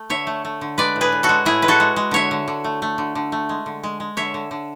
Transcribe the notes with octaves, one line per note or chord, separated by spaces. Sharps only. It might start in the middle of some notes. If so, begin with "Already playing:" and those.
Already playing: A3
D3 C#5 E5
A3
A3
D3
G#3 B4 D5
A2
G#4 B4
A2
F#4 A4
G#3
A2 E4 G#4
G#3 B4
F#4 A4
G#3
G#3
D3 C#5 E5
D3
D3
A3
A3
D3
D3
A3
G#3
D3
G#3
G#3
D3 C#5 E5
D3
D3